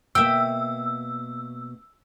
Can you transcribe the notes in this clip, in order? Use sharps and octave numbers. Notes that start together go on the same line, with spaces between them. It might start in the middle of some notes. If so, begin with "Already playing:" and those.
B2 A#3 E5 G5 E6